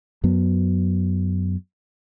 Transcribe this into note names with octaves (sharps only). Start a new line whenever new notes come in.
F#2 F#3 B3